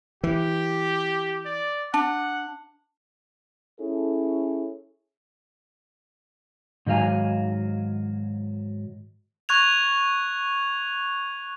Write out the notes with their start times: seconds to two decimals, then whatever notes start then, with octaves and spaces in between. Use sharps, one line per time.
0.24 E3 G4
1.46 D5
1.94 D4 F#5
3.80 C#4 E4 G#4 A4
6.86 G#2 D#3 F#3 F5 G#5
9.49 C#6 F#6 G#6 F7